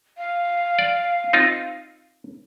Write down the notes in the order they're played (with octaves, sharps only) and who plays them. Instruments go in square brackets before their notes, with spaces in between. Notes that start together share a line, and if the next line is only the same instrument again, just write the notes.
[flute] F5
[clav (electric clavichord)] D5
C4 D#4 F4